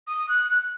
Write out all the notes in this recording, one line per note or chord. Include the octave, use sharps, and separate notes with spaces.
D#6
F#6
F#6